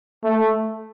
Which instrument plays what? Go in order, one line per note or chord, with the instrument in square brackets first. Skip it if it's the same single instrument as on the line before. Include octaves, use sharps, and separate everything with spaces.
[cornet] A3